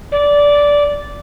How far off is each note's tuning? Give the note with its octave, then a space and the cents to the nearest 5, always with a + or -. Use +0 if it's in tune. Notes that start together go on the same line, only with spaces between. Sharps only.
D5 -15